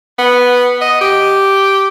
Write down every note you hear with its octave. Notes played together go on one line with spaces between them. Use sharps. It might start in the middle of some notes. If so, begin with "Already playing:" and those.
B3
D#5
G4